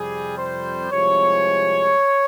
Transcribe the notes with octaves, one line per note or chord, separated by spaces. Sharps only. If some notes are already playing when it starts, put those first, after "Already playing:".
Already playing: F2 C3 G3 G#4
C5
C2 C3 F3 G#3 C#5